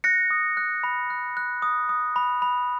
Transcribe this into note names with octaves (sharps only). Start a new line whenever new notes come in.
F#6 A#6 C#7
D#6
F#6
B5
F#6
F#6
D#6
D#6
B5
B5